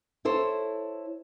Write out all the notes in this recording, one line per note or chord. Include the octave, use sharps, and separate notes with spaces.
E4 A4 C5 C#5